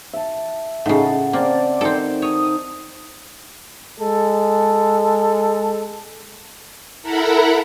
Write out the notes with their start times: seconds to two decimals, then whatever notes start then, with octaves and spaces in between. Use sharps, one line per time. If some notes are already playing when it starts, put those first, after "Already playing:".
0.13 E5 A5
0.86 A2 C#3 D#4 F#5 A5
1.33 A#3 C4 D5
1.81 D#3 C4 A4
2.22 C#5 D#6
3.98 G#3 A4
7.03 E4 A4 A#4 F#5 A#5 B5